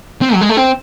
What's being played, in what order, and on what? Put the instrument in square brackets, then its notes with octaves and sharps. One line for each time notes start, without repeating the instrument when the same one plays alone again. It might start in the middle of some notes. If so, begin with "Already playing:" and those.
[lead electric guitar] C4
F#3
G#3
A3
C4